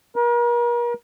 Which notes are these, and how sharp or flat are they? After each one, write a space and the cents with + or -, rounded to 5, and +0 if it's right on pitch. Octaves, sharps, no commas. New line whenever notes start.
A#4 +40